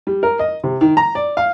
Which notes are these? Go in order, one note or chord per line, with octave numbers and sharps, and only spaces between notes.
G3
A#4
D#5
C3
D#3
A#5
D5
F5